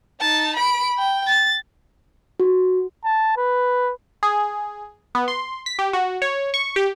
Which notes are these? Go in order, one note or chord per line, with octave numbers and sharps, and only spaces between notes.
D#4 A5
B5 D7
G5
A6
F#4
A5
B4
G#4
B3
C6
B6
G4
F#4
C#5
C#6
G4